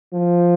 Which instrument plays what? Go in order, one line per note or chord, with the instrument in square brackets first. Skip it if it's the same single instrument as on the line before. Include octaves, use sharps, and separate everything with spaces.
[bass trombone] F3